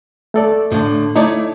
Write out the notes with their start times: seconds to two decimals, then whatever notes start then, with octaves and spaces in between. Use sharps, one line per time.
0.34 A3 A4 D5
0.72 A2 D3
1.16 A3 D#4 E4 C#5 D5